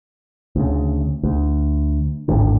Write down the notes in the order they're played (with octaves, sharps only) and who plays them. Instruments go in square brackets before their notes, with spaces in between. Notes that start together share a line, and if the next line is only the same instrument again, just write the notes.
[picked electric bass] D2 C#3
D2
G#1 D#2 A2 D3